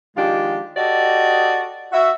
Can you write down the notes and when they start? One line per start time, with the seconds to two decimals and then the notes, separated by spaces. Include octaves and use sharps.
0.16 D#3 F3 G#3 D4 F4 G4
0.76 F#4 G4 A4 D5 D#5
1.92 F#4 E5